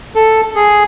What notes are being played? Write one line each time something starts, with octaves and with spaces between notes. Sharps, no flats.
A4
G#4